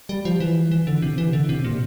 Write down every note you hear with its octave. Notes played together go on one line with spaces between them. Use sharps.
G3
F3
E3
E3
D3
C3
E3
D3
C3
A#2